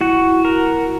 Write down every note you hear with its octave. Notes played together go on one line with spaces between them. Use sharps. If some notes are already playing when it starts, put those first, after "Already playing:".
E4 F#4
A#4